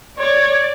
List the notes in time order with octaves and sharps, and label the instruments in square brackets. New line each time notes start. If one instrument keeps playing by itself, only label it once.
[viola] C#5 [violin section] D5